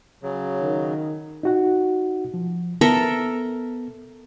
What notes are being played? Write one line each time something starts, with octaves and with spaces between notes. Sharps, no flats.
C#3 F#3
D#3
D#4 F#4 F#5
F3
B3 A4 A#4 E5